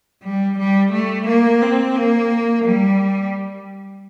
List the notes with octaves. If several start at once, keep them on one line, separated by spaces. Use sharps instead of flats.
G3
G3
A3
A#3
C4
A#3
G3